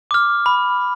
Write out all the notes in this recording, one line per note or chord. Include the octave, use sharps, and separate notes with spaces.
D6 F6
B5